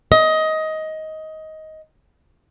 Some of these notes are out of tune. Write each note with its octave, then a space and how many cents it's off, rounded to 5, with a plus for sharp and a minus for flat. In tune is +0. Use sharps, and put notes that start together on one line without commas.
D#5 +15